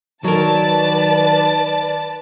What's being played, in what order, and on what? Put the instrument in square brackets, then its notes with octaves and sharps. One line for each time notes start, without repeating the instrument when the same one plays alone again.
[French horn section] D#3 [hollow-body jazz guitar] F#3 A#4 [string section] B4 D5 A5